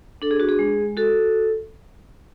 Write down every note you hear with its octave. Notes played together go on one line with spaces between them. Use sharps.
D4 A4
G#4
F#4
G#4
G#3
F#4 A4